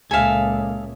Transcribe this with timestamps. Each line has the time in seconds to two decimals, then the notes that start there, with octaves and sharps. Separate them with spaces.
0.11 C#2 A#2 A4 E5 F5 G#5